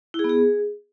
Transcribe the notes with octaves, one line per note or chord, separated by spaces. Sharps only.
E4
G#4
B3
G#4